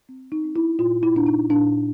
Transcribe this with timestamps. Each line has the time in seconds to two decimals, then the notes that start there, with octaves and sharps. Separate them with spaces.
0.09 C4
0.32 D#4
0.44 C4
0.56 E4
0.79 A#2 F4
1.03 E4
1.14 A#2 D4
1.26 D#4
1.50 A#2 D4